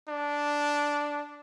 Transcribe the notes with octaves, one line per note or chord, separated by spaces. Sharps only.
D4